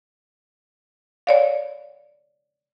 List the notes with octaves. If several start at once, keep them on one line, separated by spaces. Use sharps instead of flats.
C#5 D5 F5